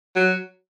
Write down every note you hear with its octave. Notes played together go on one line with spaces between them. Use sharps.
F#3